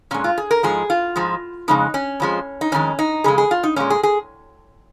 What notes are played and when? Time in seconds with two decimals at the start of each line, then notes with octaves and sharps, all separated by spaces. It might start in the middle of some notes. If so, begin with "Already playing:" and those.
0.11 A#2 G#3 C#4
0.24 F4
0.38 G#4
0.51 A#4
0.63 G#2 F3 G#3 G#4
0.90 F4
1.16 G#2 F3 G#3
1.68 F2 C#3 G#3 D#4
1.94 C#4
2.20 F2 F3 G#3
2.61 D#4
2.72 F2 D#3 G#3 C#4
2.99 D#4
3.24 F2 C#3 G#3 G#4
3.38 G#4
3.51 F4
3.63 D#4
3.76 A#2 G#3 C#4
3.90 G#4
4.03 G#4